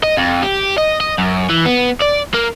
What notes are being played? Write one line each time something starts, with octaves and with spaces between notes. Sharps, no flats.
D#5
F2
G4
D#5
D#5
F#2
E3
B3
D5
A#3